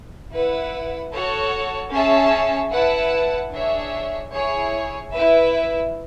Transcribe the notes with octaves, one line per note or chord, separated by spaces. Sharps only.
E4 B4 F#5
F#4 A4 C#5 F#5 A5
C#4 G#4 C#5 E5 A5
E4 B4 F#5 A5
D4 G#4 C#5 E5
E4 G#4 C#5
E4 B4 E5